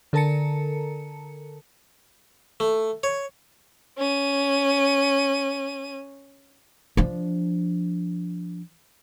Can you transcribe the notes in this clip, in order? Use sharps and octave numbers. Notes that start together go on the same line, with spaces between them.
D3 A4 A#4 A5 A#5 C#7
A3
C#5
C#4 D#7
F3 D4